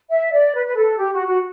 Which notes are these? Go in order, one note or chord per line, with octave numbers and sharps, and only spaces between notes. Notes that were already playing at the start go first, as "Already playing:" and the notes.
E5
D5
B4
B4
A4
G4
F#4
F#4